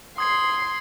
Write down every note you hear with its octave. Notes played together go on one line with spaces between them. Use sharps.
C6 D#6 G#6 C7